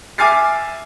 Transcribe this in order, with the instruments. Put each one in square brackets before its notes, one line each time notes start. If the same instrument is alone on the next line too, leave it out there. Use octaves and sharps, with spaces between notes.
[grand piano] E5 G#5 D6 F6 A6 C7